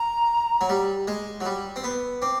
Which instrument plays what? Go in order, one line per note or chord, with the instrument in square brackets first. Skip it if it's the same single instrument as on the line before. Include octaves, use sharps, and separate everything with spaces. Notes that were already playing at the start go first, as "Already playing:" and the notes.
Already playing: [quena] A#5
[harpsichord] F#3
G3
G#3
F#3
G3
C4
B3
[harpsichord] C4 [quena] D6